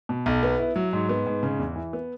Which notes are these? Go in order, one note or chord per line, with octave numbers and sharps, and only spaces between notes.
B2
B1
B3
E4
F#3
G#2
B3
G#2
C#3
E2
E3
B3